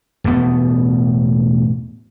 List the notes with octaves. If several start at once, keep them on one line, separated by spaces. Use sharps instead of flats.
E1 A2 A3 B3